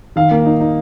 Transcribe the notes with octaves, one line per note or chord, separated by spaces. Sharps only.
D#3 F5
A#3
D#4
D#4